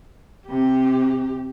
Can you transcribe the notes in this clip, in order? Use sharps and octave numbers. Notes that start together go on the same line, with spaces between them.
C3 G4